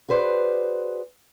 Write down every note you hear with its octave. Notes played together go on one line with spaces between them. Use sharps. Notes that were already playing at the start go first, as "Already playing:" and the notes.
F#4 G#4 B4 C5 D5